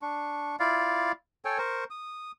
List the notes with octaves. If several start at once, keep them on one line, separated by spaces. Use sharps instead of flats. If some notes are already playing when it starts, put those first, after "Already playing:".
D4 C#6
E4 F4 D5 F5
A4 C#5 G5 G#5
A#4 C5 C#6
D#6